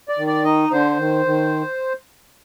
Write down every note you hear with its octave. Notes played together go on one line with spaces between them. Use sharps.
D5
D#3
D5
D#4 D#5
D3 C5
D#3
D#3